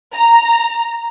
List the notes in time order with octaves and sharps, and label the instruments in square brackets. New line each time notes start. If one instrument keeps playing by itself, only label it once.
[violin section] A#5